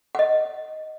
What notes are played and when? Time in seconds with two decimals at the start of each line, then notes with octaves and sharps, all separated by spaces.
0.15 D#5 F#5